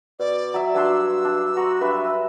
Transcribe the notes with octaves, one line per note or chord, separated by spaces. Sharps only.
B2 D5
F#3 E5
G2 F#3 D4 C6 E6
D4
F#4 A#5 C6
G2 B4 E5